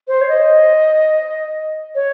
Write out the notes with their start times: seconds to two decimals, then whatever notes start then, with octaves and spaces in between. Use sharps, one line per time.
0.08 C5
0.21 C#5
0.29 D#5
1.95 C#5